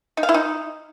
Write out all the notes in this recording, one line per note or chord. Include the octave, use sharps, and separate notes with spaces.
D#4
F5
E4
D#4